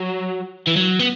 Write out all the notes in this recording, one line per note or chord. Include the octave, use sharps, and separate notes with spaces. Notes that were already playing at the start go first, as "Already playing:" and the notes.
Already playing: F#3
E3
F#3
B3